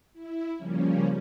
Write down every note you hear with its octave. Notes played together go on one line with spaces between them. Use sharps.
E4
C#3 F3 G3 A#3 C#4